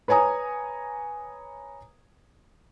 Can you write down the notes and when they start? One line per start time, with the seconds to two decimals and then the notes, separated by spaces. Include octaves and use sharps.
0.08 B4 C#5 G#5 A#5 D#6